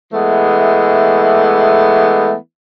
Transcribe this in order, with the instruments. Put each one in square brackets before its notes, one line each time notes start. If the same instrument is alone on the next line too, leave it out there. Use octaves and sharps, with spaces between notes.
[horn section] E3 G#3 A3 B3